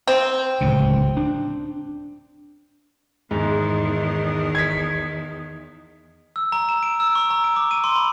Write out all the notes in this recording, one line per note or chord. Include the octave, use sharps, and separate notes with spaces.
C4
D1 C#2 C#3
D4
E2 G#2 D#3
G#6 B6
E6
A#5
E7
D7
E6
C#6
A#5
D7
D6
D#7
C6
B5